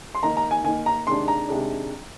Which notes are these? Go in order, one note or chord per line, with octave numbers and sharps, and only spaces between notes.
C6
D#3 A#3 D#4 A#5
A#5
G#5
D#3 A#3 D#4 G#5
A#5
C3 D#3 G#3 D4 C6
A#5
C3 D#3 G#3 D4